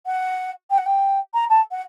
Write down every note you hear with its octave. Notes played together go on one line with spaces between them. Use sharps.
F#5
G5
F#5
G5
A#5
A5
F#5